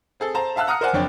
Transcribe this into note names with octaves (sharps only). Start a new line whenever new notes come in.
C4 G#4 A4
C5 A5 A#5
E5 F5 A5 E6 F#6
F#5 A#5 D#6 F6 F#6 C#7
A#4 C5 D5 F#5 G#5
F#1 F2 D4 C#5 G5